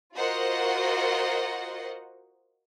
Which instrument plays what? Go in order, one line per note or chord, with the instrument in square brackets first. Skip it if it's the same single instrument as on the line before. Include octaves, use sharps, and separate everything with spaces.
[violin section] F4 F#4 A#4 C5 D#5 F#5